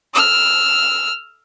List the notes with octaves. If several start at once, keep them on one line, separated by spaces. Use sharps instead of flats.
E6 F6